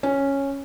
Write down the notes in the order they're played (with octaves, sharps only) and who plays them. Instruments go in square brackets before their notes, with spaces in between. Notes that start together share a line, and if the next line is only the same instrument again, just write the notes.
[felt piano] C#4